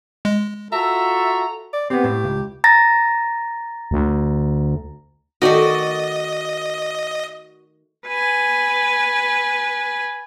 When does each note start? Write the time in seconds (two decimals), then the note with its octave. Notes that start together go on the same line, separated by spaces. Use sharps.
0.25 G#3
0.72 F4 F#4 A4 E5 A#5
1.73 D5
1.90 B3 C4 G4
2.04 A2
2.24 C#2
2.64 A#5 A6 A#6
3.91 D2
5.42 D#3 A3 F#4 D5 D#5
8.07 B4 G#5